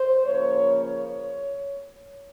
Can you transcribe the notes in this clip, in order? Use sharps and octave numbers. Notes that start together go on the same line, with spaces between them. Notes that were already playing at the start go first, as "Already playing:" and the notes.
Already playing: C5
C#3 F3 A#3 C#5
C#5